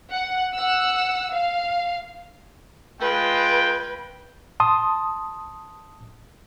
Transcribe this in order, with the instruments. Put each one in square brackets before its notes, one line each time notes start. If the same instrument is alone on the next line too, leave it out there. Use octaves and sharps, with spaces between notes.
[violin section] F#5
F#5 E6
F5
[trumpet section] G#3 F4 G5 [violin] B4
[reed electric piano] A5 C6 D#6